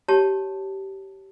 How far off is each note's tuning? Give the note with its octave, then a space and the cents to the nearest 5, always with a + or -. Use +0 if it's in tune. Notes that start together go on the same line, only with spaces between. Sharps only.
G4 -20 C#5 +0 A5 +0